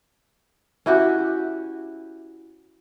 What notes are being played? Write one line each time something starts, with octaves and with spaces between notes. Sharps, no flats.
C#4 E4 F#4 G4